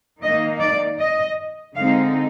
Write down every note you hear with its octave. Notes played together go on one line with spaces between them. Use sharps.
D#3 A#3 D#4 D#5
D5
D#5
D3 G#3 C4 D#4 F5